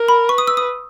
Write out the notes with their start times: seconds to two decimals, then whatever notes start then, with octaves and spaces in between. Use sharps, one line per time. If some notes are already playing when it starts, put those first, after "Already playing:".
Already playing: A#4
0.08 B5
0.29 B4 C#6
0.38 D#6
0.47 E6
0.57 D#6